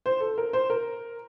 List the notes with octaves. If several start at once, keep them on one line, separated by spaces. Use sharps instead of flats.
C5
A4
A#4
C5
A#4